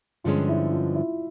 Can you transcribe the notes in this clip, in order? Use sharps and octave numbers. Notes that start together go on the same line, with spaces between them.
G2 D3 F3 G#3 C#4 F4
E4
F4
E4